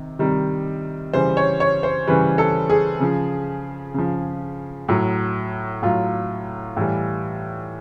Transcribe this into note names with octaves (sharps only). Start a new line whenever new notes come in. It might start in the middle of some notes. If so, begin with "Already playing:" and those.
Already playing: C3 D#3
C3 D#3 G3
C#3 E3 G3 C5
C#5
C#5
C5
C#3 E3 G3 B4
A4
G#4
C#3 F3
C#3 F3
A2 F#3
A2 F#3 F4
A2 E3 G3